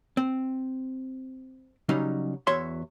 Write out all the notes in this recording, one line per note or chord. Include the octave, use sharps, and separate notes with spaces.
C4
C#3 F#3 G3 C#4 D#4
E2 F#4 C#5 E5 C6